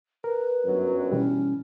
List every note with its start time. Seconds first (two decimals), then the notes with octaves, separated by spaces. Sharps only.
0.24 A#4 B4
0.66 G1 F#2 F#3
1.12 B2 E3 G3 C#4